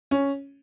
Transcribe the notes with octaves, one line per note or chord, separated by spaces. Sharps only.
C#4